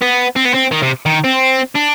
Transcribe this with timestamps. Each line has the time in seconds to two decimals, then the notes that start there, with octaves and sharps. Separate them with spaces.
0.02 B3
0.36 C4
0.45 B3
0.54 C4
0.72 D#3
0.83 C3
1.06 D#3
1.24 C4
1.75 D4